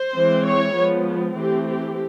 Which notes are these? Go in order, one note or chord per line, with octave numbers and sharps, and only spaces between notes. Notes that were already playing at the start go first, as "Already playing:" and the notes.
Already playing: C5
E3 G#3 C4
C#5
F3 G#3 B3
E3 A3 C4 G4
G4